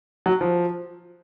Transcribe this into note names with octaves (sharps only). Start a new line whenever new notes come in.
F#3
F3